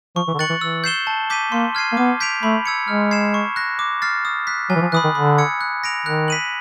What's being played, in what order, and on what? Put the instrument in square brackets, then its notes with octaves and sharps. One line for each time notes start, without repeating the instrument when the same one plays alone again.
[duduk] F3 [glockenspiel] C#6
[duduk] E3
D3
[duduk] D#3 [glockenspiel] F#6 A6 C#7 F#7
[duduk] E3
[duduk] E3 [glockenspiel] E6
[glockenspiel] G6 C7 E7 G7
A5
D6 G6 B6 D#7
[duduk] A#3 [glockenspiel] C6
[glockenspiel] F6 G#6 C7 D#7
[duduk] A#3
[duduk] B3 [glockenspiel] D6
[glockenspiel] G6 B6 D7 F7
[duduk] A3 [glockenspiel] B5
[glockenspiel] E6 G#6 C#7
[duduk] G#3 [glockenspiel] F6
[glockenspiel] G#6 C7 E7
C#6
F#6 A#6
D6
F6 A6 C7
D#6
F#6 B6
[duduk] F#3 [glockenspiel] G#5
[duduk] E3
F3
[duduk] E3 [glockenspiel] B5 D#6 F#6
[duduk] D#3
[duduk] D3 [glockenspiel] B5
[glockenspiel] E6 G#6 C#7
F#6
A#6 D7 F7
[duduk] D#3 [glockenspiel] F#6
[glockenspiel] B6 D#7 F#7